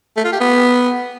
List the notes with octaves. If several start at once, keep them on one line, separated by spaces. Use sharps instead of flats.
A3
F4
G4
B3